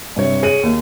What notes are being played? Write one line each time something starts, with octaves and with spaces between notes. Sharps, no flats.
G2 C3 C#5
G#4 C#5 D#7 F#7
D#2